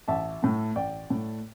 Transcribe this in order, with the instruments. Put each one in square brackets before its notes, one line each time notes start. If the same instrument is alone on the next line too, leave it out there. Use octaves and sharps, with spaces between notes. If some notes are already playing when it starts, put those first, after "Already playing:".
[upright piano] A1 E5 A5
A2 A3
A1 D5 G5
A2 A3